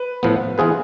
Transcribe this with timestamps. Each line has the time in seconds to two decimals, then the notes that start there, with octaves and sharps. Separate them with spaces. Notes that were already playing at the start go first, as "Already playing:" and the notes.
Already playing: B4
0.23 A2 F3 B3
0.58 E3 B3 F4 G#4 B4